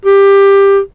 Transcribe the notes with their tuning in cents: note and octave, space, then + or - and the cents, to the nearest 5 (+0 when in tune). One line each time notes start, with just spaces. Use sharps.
G4 +15